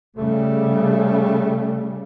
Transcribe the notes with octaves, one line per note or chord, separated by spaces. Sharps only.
C#3 G3 A3